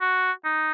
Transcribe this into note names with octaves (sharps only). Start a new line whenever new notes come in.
F#4
D#4